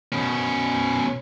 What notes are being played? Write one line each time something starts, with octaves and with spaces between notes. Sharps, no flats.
B2 C#4